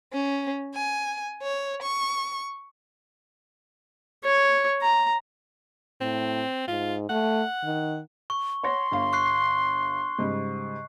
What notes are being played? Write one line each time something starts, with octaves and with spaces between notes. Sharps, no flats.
C#4
G#5
C#5
C#6
C#5
A#5
A2 C4
G#2 F4
A3 F#5
D#3
C#6
C#5 F#5 C6 A#6
G1 F5
C#6 F#6 C7
G#2 C#3 G3